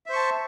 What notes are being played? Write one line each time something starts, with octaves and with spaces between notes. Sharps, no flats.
C5 E5 A5 C#6